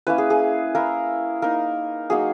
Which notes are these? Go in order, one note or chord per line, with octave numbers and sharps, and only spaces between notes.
A#3 C#4 E4 B4
G#4
G#4
A#3 E4 A#4
A#3 D#4 A#4
F#3 A#3 D#4 G#4